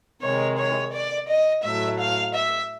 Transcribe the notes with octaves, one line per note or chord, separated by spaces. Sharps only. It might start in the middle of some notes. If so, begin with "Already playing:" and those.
C3 D#3 G#3 C#5
C#5
D5
D#5
A2 F#3 A3 E5
F5
E5